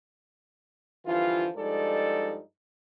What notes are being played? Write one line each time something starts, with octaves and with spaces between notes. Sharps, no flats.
G2 D3 E3 F3 F4
G2 F3 G#3 D#4 A4 D5